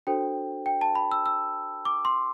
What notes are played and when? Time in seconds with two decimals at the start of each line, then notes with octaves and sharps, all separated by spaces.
0.07 D4 F#4 A4 C5 G5
0.66 G5
0.81 A5
0.95 B5
1.12 E6
1.26 E6
1.85 D6
2.05 C6